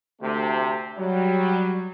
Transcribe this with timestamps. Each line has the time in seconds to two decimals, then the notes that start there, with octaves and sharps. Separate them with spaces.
0.21 D2 C3 A3
0.98 F#3 G3